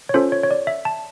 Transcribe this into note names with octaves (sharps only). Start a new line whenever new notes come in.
C#5
C#4 F4 A4 C5
C#5
C#5
D5
E5
A5